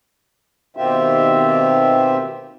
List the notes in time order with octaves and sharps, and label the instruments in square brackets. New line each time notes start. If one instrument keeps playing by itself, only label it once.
[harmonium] B2 D#3 C4 F4 G4 E5